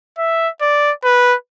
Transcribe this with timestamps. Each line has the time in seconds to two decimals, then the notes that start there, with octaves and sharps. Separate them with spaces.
0.18 E5
0.61 D5
1.04 B4